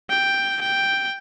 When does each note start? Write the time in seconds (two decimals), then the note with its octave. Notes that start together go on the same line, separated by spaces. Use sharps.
0.10 G5
0.61 G5